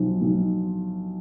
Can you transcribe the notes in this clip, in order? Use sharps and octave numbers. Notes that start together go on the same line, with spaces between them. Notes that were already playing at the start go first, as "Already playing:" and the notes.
Already playing: B1 F3
B1